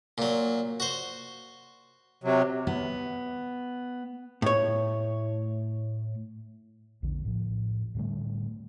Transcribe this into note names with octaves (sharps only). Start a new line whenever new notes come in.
A#2 F#3
F#4 C5
C3 F#3
B3
A2 C#5
A#1 E2 D3
A2 F3
A2 D3 G3 A3